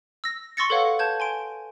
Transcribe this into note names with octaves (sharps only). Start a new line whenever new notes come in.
E6 A#6
C6 C#6 E6 A6 A#6 C#7
A4 B4 C#5 F5 F#5
B4 A5 G6 G#6
G#5 C6 D7